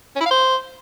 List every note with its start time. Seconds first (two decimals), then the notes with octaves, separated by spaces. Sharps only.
0.15 C#4
0.20 E4
0.26 F5
0.31 C5